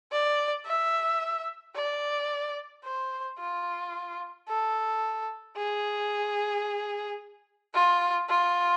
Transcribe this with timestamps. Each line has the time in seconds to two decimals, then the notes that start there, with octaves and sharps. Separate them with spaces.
0.12 D5
0.66 E5
1.76 D5
2.85 C5
3.39 F4
4.48 A4
5.57 G#4
7.75 F4
8.29 F4